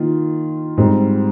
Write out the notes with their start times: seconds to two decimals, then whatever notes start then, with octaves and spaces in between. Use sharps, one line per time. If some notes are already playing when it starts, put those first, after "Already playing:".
Already playing: D#3 A#3 F4
0.77 G#2 G3 C4